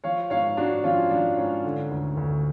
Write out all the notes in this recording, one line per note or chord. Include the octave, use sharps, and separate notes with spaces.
F3 C#5 F5
G#2 C#5 F5
G#2 D4 F#4
F3 C#4 F4
F3 D4
G#2 C#4
D3
D2
D2